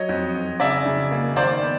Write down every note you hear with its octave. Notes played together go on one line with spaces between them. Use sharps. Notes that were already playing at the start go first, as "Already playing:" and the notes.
Already playing: F#3 C#5 D#5
F2
F2
C#3 D5 E5
C#3
A#3
D#3 C5 D5
B3